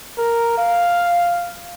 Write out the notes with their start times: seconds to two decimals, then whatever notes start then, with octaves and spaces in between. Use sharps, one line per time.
0.17 A#4
0.58 F5